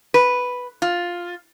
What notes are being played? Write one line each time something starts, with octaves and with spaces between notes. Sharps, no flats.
B4
F4